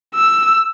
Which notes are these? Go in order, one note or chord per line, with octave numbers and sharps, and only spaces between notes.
E6